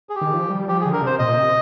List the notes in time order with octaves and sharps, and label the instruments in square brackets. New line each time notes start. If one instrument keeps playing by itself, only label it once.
[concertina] G#4
G4
[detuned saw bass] D#3
F3
G3
[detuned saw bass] F3 [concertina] G4
[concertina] G#4
[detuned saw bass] D3
[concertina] A#4
[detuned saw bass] C3 [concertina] C5
[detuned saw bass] A#2 [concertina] D#5
[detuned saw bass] C3